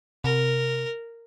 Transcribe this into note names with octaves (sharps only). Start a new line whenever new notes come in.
C3 A#4